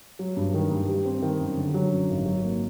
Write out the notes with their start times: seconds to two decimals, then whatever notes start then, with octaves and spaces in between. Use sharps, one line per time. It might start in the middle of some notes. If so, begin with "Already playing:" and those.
0.19 F#3
0.37 G2
0.54 D#3
0.71 G2
0.88 G3
1.05 C4
1.22 D#3
1.40 F#2
1.57 D3
1.74 F#3
1.91 F#2
2.09 G#1
2.26 F#3
2.43 A#3